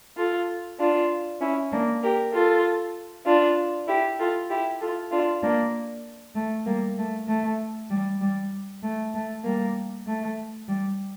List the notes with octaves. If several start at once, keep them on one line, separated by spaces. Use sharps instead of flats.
F4 A4
D4 F4
C#4 E4
A#3 D4
G4 A#4
F4 A4
D4 F4
E4 G4
F4 A4
E4 G4
F4 A4
D4 F4
A#3 D4
A3
G3 A#3
A3
A3
G3
G3
A3
A3
G3 A#3
A3
G3